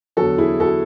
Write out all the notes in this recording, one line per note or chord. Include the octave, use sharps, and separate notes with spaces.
E2 D3 F#3 F#4 A4
E4 G#4
F#4 A4